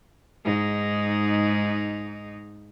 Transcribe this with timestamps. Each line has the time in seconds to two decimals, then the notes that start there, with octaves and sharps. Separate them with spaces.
0.45 G#2 D#4